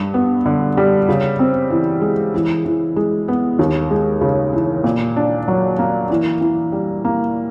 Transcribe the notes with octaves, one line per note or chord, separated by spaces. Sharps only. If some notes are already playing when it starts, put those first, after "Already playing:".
Already playing: G2
B3
D3
G3
C#3
C4
E3
G#3
E3
E3
G#3
B3
D#2
G#3
C#3
E3
A#2
D4
F#3
A#3
E3
E3
G3
A#3